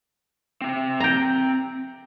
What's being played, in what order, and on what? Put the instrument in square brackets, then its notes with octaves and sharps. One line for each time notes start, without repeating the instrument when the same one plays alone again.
[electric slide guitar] C4 E5
[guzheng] G5 A#5